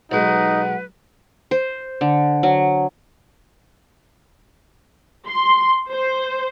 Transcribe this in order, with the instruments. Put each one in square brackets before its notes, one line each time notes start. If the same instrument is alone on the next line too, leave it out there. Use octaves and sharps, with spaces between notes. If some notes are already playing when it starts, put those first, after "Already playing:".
[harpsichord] B1 G#3 [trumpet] D#4 [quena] B4 [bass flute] F#5
[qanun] C5
D3
F#3
[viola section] C6
C5